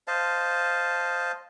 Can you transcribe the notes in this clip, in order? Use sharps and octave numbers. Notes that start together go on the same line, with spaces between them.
C5 D#5 F5 A5